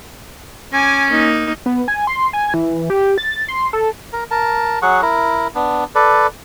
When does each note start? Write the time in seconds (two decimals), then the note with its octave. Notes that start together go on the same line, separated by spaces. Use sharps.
0.73 C#4 G#5 D6
1.10 A#3 D#4
1.66 B3
1.88 G#5
2.07 C6
2.33 G#5
2.54 E3
2.90 G4
3.18 A6
3.48 C6
3.73 A4
4.13 A#4
4.31 A#4 A5
4.82 F#3 G#4 F#5 C#6
5.02 E4 A#4
5.55 B3 D4
5.95 A4 B4 D5